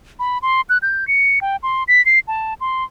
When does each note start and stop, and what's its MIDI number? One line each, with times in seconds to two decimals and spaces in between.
0.19 0.38 83
0.42 0.61 84
0.69 0.78 90
0.82 1.07 91
1.08 1.39 97
1.41 1.56 79
1.63 1.84 84
1.88 2.04 95
2.06 2.19 96
2.28 2.54 81
2.61 2.84 84